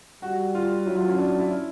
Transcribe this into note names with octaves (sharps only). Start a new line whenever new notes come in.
G3 F#4
F4
F#3 E4
F4
C#4
F#3 D4
E4